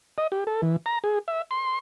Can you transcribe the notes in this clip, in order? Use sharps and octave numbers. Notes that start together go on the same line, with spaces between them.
D#5
G4
A4
E3
A#5
G#4
E5
C6